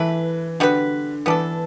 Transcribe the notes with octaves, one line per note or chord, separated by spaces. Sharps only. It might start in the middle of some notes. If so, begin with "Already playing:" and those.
Already playing: E3 A3 E4 B4
D3 G3 B3 F#4 B4
E3 B3 D4 A4